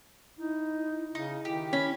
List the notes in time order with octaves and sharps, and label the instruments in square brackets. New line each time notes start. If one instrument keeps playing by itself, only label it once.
[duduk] D#4 [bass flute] E4
[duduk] C#3 [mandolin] D#4
[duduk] D#3 [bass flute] E4 [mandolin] G4
[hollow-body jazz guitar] C#4 [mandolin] B5